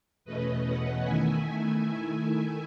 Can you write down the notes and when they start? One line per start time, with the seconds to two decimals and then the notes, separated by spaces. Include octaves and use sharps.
0.25 E2 B2 A3 C#4 B4 D#5
0.64 D#5 F#5
1.02 D#3 A3 E4 E5 G#5